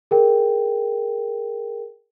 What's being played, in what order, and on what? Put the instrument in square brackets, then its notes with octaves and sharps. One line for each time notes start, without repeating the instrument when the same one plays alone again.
[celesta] G#4 A#4 G5